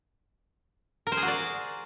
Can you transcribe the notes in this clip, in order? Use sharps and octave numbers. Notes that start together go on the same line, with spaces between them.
A#4
C5
G#4
F#4
D5